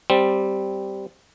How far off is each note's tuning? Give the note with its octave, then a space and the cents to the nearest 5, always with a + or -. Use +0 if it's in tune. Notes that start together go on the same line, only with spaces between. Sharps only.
G3 +0 C4 -5